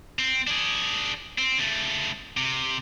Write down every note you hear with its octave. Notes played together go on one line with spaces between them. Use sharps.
C4
D4 G#4
C4
C#3 A3
C3